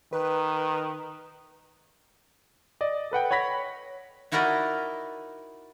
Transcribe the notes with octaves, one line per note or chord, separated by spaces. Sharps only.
D#3 B4
D5 D#5
A4 B4 F#5 G5
C#5 F#5 B5 A#6 B6
D#4 E4 F#4 A#4 D5 D#5